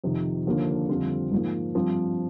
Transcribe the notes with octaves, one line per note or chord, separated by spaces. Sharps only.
F2 C3 D#3
D#2 D3 F3 A#3 D4
F2 D3 G3 C4 F4
G#2 F3 A#3
G2 F3 C4